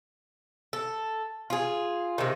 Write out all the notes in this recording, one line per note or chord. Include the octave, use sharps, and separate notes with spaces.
A4
F4 G#4
C3 D#3